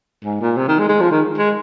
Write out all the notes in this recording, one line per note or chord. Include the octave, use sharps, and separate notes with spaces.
G#2
A#2
C3
D#3
G#3
G#3
F3
D#3
G#3